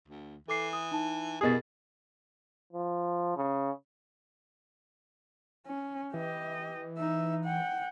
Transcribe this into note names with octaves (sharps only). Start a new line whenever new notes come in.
D2
E3 A4 D6 C7
D#6
D#4 A5
E2 B2 G4 G#4 A#4 A6
F3
C#3
C#4
E3 G4 D#5
D#4 E5
F#5 G5